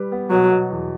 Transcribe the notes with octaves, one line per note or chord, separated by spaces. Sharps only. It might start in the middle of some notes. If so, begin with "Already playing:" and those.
Already playing: G3 G4 B4
B3
B2 F#3
B2
E2